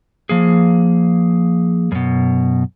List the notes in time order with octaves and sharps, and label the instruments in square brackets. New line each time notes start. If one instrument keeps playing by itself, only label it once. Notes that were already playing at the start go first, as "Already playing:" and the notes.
[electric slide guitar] F3 A#3 G#4
F#2 B2